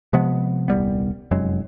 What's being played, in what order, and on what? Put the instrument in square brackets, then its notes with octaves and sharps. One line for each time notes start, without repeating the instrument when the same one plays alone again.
[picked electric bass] C3 F3 G#3 B3
D#1 C2 G3 B3
F1 F#2 F#3 G#3